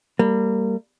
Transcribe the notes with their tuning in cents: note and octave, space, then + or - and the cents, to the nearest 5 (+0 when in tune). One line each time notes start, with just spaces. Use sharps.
G3 +0 A#3 -30